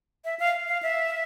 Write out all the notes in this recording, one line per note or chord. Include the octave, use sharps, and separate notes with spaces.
E5
F5
F5
E5